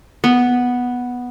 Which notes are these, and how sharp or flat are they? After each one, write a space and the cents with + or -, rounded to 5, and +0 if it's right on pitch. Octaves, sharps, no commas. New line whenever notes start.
B3 -5